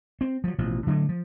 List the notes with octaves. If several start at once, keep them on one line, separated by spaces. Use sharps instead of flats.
C4
F3 F#3
A1 B2 F3
D3 F#3 G3 A3
F3